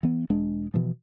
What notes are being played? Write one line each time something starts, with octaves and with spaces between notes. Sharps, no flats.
E3 B3
E1 G#3 D4
B2 E3 F3